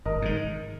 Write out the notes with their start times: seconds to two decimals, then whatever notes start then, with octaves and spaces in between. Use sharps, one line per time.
0.06 G#1 A#4 D#5
0.22 G#2 D#3